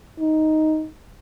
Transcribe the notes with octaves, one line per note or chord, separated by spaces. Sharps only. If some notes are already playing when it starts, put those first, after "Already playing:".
D#4